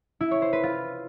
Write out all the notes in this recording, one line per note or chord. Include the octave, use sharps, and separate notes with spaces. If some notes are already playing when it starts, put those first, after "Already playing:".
E4
C#5
C5
B4
F4